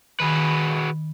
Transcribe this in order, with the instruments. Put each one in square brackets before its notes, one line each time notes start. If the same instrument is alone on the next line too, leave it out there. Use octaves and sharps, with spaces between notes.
[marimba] D#3 B5 [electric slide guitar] F#4 G#4 B4